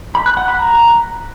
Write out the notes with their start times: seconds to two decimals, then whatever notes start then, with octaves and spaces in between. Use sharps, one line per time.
0.15 B5
0.26 F#6
0.37 F#5
0.48 B5
0.59 A#5